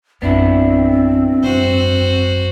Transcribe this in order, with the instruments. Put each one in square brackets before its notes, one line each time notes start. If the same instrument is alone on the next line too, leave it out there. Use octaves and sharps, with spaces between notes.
[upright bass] A#1 F#2 [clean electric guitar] B3 D4 E4 [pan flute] C4
[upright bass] G#1 F#2 [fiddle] F#4 C5